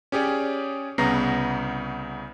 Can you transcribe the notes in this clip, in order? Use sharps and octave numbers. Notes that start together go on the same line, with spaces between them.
C#4 G4 G#4 C#5 D5
C2 C#3 B3 A#5 A#6 C7